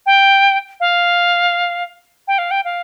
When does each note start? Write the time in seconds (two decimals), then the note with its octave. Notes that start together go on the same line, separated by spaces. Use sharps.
0.06 G5
0.80 F5
2.28 G5
2.38 F5
2.51 G5
2.65 F5